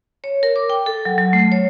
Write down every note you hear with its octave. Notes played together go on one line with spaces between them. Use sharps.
C#5
A#4
D6
G5
A4
F#3
F#3
A3
C#5